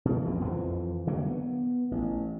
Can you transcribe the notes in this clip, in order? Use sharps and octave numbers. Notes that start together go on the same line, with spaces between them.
B2 E3 A#3
A#1 F2 B2
F2 E3 F3
D3 F#3 G3 A#3
B3
A1